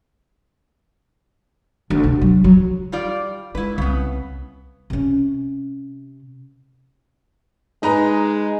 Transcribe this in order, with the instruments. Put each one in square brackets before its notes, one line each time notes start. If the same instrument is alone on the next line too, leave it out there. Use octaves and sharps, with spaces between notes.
[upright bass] D2
C3
F#3
F#3
[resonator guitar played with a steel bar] G3 F4 D5
[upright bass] G#3 [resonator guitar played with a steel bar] E4 B4
[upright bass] C2 [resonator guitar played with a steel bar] C#3 B3
[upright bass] C3 C#4
[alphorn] G#3 [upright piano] D#4 B4 A#5